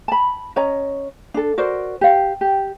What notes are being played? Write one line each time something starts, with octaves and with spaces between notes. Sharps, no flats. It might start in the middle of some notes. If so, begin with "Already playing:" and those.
A5 B5
C#4 C#5 D#5 A#5
D4 A4
F#4 A#4 C5 D5
G4 F5
G4